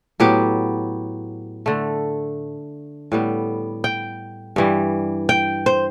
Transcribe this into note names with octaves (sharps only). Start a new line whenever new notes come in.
A2 F#3 B3 G4
D3 A3
A2 G3 B3
G5
G2 E3 G3
G5
C5